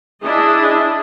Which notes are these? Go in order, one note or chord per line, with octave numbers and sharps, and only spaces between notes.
D4 E4 G#4 D#5